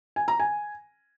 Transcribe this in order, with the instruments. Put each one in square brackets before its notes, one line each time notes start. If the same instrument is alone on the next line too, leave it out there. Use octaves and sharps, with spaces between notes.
[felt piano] G#5
A#5
G#5